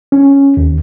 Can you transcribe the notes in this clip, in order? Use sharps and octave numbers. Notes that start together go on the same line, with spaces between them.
C#4
D#2